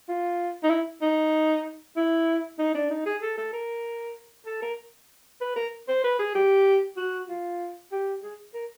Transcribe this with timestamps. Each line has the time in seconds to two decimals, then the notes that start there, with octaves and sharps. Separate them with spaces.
0.09 F4
0.63 D#4
0.70 E4
1.02 D#4
1.97 E4
2.59 D#4
2.74 D4
2.90 D#4
3.06 G#4
3.22 A4
3.37 A4
3.53 A#4
4.46 A4
4.62 A#4
5.41 B4
5.56 A#4
5.88 C5
6.04 B4
6.19 G#4
6.35 G4
6.97 F#4
7.29 F4
7.92 G4
8.23 G#4
8.54 A#4